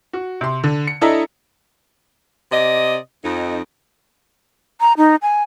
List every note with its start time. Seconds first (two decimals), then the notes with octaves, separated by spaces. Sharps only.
0.13 F#4
0.41 C3 C6
0.63 D3
0.87 C#7
1.01 D4 E4 A4 D#5 E5 A#5
2.52 C3 D5 D#5
3.24 F2 D#4
4.81 A#5
4.97 D#4
5.22 G#5